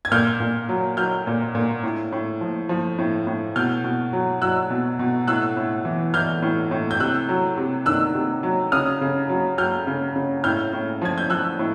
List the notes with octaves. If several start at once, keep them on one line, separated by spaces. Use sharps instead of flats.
G#6
A#2 F6 G6
A#2
F#3
F#3 F6 G6
A#2
A#2
A2
A2
F3
F3
A2
A2
B2 F6 G6
B2
F#3
F#3 E6 F#6
B2
B2
A2 E6 F#6
A2
E3
E3 F6 G6
A2
A2
G6
C3 E6 F#6
F#3
C3
D#3 E6 F#6
C3
F#3
C#3 D#6 F6
C#3
F#3
F#3 F6 G6
C#3
C#3
A2 F6 G6
A2
F3 G#6
G6
F3 E6 F#6
A2